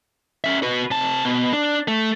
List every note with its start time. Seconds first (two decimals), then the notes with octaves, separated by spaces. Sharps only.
0.44 C#4 E5
0.62 F#4 B4
0.91 C3 A5
1.25 B2
1.53 D4
1.88 A3